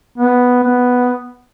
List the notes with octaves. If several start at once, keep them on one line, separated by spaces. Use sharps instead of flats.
B3
B3